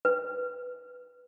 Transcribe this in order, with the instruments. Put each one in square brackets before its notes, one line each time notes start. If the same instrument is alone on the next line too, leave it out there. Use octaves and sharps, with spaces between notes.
[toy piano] B4